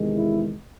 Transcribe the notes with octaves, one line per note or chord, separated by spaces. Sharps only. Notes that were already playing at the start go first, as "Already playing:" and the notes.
Already playing: E2 C3 D#3 G#3
E4